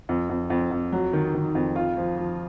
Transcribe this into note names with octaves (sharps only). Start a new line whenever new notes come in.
F2
F2
F2
F2
F#3
D#3
D#3
F2
F4
F3
F3